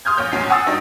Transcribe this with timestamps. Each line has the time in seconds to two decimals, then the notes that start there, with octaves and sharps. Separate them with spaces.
0.05 C6 D#6 F6 G6 G#6
0.17 A#1 A#2 C#5 G6
0.32 A#1 E2 G#2 C#4 C7
0.50 F#5 G#5 C#6 D#6 E6 A6
0.66 G2 F#3 D4 D#4 G5